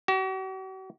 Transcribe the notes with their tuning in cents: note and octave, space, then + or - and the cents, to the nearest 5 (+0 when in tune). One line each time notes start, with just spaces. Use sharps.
F#4 +45